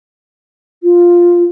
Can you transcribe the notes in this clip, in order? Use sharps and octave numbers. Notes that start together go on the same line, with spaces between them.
F4